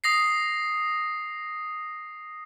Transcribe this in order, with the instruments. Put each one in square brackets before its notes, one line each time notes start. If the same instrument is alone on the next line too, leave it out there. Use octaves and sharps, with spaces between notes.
[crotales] D#6 A#6 C7